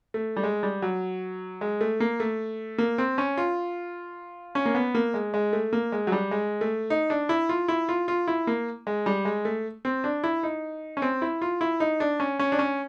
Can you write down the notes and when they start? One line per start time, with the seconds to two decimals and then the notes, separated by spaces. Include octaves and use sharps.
0.14 A3
0.36 G3
0.43 G#3
0.63 G3
0.82 F#3
1.61 G#3
1.81 A3
2.00 A#3
2.20 A3
2.78 A#3
2.98 C4
3.18 C#4
3.37 F4
4.55 C#4
4.66 A#3
4.75 B3
4.95 A#3
5.14 G#3
5.34 G#3
5.53 A3
5.73 A#3
5.92 G#3
6.07 F#3
6.12 G3
6.31 G#3
6.61 A3
6.90 D#4
7.10 D4
7.29 E4
7.49 F4
7.68 E4
7.89 F4
8.08 F4
8.28 E4
8.47 A#3
8.87 G#3
9.06 G3
9.25 G#3
9.45 A3
9.85 C4
10.04 D4
10.24 E4
10.43 D#4
10.97 C#4
11.02 C4
11.22 E4
11.41 F4
11.61 E4
11.80 D#4
12.00 D4
12.20 C#4
12.39 C#4
12.52 D4
12.59 C#4